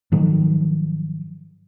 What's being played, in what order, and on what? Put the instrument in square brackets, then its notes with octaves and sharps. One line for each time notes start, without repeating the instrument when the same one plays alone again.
[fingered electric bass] G#2 D#3 F3 F#3